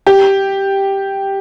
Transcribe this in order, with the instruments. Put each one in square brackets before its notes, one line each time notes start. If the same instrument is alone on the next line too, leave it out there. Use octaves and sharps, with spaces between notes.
[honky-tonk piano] G4